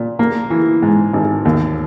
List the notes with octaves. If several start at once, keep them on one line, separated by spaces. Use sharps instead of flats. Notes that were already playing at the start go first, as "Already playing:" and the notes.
Already playing: A#2
A#3
E3
G#2
G#1
D#2